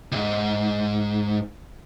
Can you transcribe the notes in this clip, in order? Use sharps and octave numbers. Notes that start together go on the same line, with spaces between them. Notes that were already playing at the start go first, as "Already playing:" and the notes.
C#2 G#2